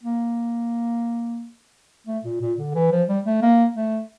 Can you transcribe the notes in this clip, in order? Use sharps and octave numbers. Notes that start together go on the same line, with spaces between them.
A#3
A3
A#2
A#2
D3
E3
F3
G3
A3
A#3
A3